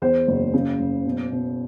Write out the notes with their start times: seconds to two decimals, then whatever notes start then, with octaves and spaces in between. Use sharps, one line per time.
0.02 E2 C5
0.27 F#1
0.54 C#3
0.79 F#1
1.05 B2
1.31 B2